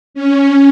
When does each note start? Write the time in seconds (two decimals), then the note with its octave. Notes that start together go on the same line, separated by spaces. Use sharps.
0.14 C#4